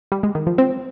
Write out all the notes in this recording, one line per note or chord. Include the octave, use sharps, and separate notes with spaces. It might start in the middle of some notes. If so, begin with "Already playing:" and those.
G3
G#3
D#3
F3
C4